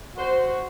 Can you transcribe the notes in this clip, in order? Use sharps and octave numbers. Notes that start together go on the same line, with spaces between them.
F#4 C5